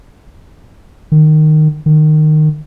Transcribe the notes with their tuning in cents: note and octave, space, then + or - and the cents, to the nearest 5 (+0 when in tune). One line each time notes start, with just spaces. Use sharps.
D#3 -15
D#3 -20